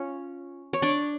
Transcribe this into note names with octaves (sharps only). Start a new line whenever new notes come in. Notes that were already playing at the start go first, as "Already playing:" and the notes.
Already playing: C#4 F4 C#5
C#5
D4 D5